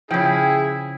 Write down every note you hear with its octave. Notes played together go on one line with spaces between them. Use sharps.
C#3 F3 E4 G#4 G5